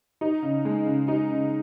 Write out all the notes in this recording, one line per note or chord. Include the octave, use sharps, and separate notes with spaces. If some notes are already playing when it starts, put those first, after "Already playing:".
D#4
C#3
G#3
C#3
D#4
C#3